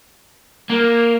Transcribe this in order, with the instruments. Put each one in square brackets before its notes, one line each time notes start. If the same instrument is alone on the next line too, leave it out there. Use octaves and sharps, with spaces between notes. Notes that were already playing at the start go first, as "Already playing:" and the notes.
[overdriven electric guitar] A#3